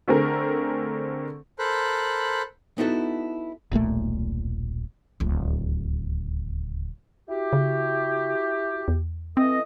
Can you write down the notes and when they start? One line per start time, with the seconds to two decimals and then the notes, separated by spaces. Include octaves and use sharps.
0.08 D3 A3 C4 G#4 A#4
1.59 A4 A#4 C5 B5 F#6
2.78 B3 D#4 E4 F#4 A4
3.72 D#1 B1 A#2 A3
5.20 D1 C#2
7.29 E4 F#4 G4
7.53 C#3
8.88 E2
9.37 E3 C4 A4 D#5